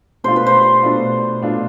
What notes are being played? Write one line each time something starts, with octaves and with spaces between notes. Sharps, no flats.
B2 A3 D4 F4 C5
B4
C5
B2 A3 D4 F4
B2 A3 D4 F4